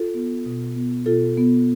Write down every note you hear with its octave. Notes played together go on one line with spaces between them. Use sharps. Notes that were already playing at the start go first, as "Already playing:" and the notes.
Already playing: F4 A4
B3
B2
B3
B2 F4 A4
B3